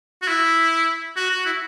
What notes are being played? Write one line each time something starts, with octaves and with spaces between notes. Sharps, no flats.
F#4
E4
F#4
F#4
E4